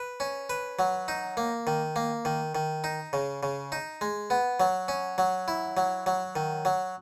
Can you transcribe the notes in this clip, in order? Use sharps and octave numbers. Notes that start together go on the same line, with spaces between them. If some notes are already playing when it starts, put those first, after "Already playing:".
Already playing: B4
C#4
B4
F#3
D#4
A#3
D#3
A#3
D#3
D#3
D#4
C#3
C#3
D#4
G#3
B3
F#3
C#4
F#3
E4
F#3
F#3
D#3
F#3